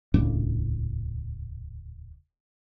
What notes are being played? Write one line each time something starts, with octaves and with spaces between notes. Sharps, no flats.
D#1 C#2 A2 D4